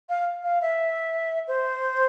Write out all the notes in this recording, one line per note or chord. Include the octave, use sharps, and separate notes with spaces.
F5
F5
E5
C5